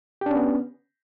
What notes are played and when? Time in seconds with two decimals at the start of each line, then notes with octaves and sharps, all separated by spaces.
0.21 G4
0.26 D4
0.31 C#4
0.36 B3